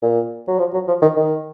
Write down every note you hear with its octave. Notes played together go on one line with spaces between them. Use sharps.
A#2
F#3
F3
F#3
F3
D#3
D#3